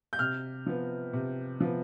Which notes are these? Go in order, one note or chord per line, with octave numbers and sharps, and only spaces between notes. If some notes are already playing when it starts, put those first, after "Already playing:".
G6
C3 F6
F3 B3
C3
F3 B3